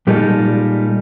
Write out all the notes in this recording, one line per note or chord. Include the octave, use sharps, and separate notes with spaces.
A#2 G3 G#3 D#4 F4 A4